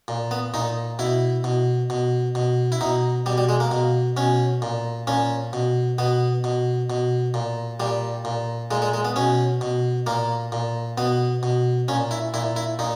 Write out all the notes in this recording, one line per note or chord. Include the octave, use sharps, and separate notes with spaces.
A#2
B3
A#2 D#4
B2 E4
B2
B2
B2
E4
B2 D#4
B2 G3
G3
G#3
A#3
B2
B2 C#4
A#2
A#2 C#4
B2
B2 B3
B2
B2
A#2
A#2 G3
A#2
A#2 G#3
G#3
G#3
B3
B2 C#4
B2
A#2 A#3
A#2
B2 B3
B2
A#2 C#4
E4
A#2 E4
E4
A#2 D#4